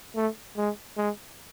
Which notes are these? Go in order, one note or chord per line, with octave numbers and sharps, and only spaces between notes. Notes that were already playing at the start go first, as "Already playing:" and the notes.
A3
G#3
G#3